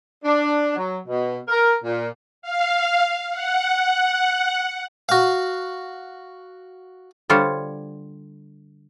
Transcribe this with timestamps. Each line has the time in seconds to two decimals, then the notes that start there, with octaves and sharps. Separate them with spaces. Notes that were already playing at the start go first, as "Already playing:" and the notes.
0.25 D4
0.76 F#3
1.07 B2
1.47 A#4
1.84 A#2
2.42 F5
3.32 F#5
5.09 F#4 F5
7.29 D3 G3 F4 C5 C#5